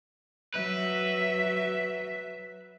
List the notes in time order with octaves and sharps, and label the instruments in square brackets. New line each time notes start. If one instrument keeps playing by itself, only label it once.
[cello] F#3 E5 [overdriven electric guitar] B4